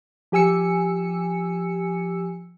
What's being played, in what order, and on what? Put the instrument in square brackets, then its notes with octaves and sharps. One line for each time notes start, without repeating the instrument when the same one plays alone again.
[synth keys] F3 G4 G#5 E6 C#7